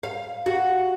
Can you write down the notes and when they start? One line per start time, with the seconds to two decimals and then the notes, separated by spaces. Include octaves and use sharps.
0.03 F5
0.46 F#4